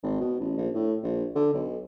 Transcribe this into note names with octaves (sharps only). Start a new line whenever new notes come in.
G#1
B2
A1
A#1
A2
A#1
D3
B1